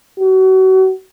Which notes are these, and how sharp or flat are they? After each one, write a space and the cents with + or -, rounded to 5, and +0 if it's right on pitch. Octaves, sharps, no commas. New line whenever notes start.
F#4 +35